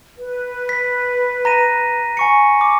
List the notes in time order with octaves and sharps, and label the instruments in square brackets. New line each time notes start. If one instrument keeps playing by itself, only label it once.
[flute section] B4
[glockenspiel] B6
A#5 A#6 D#7
G#5 C#6 C#7
D6